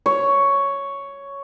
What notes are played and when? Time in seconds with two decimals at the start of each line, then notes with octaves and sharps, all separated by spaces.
0.06 C#5